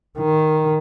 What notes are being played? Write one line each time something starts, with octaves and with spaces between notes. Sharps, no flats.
D#3